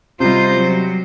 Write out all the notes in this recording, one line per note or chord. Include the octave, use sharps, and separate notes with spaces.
C3 G3 D#4 F4 C5
F#3